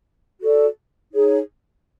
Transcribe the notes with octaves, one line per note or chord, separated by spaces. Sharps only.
F#4 A4 D5
D#4 G#4 C#5